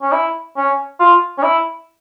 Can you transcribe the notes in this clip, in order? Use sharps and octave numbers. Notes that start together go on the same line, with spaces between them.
C#4
E4
C#4
F4
C#4
E4